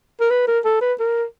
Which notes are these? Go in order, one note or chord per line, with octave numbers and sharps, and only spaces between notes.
A#4
B4
A#4
A4
B4
A#4